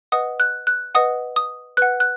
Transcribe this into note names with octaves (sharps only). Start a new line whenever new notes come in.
B4 D#5 F#5 D#6
F#6
F#6
B4 D#5 F#5 D#6
D#6
B4 F#5 F#6
F#6